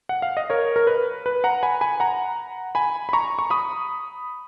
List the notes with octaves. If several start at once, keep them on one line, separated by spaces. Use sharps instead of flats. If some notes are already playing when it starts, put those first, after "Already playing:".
F#5
F5
D#5
A#4 C#5
A#4
B4
B4
F#5 A#5
G#5 B5
G#5 B5
F#5 A#5
G#5 B5
B5
A#5 C#6
C#6
B5 D#6